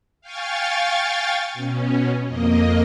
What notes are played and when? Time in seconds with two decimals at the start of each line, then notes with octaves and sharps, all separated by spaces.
0.21 F5 G5 G#5 C#6 A6
1.54 B2 C#4
2.25 F2 A#3 D#5